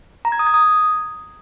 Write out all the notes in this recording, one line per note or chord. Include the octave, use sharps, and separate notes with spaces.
A#5
G#6
D#6
G#6
D#6